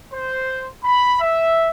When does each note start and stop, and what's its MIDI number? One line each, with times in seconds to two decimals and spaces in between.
0.14 0.68 72
0.84 1.17 83
1.21 1.70 76